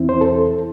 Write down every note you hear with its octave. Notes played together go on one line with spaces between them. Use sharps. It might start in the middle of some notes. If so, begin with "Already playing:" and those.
Already playing: E2 E3 C4 E4
C5
A4